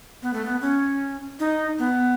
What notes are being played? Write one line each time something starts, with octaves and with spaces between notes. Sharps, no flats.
B3
A3
B3
C#4
D#4
B3